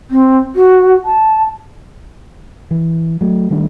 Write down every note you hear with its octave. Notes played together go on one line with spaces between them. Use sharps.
C4
F#4
A5
E3
F#3 A3
D#3 G3 A3 D4